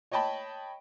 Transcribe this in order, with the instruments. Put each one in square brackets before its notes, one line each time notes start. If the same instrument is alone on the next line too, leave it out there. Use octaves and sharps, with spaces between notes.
[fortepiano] C#5 D#5 G5 A5 B5